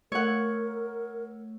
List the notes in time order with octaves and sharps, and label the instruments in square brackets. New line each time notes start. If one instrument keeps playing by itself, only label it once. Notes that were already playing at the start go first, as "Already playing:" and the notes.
[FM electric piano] A3 [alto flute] A#4 [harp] C#5 F#5